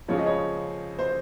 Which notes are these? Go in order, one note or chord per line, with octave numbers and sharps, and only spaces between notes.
C#2 C#3 F3 C#5
D#5
C#5
C5